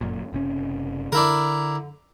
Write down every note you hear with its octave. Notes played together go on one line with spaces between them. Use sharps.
G1 F#2 A#2
F#1 C3 C#4
D3 D4 E4 A#4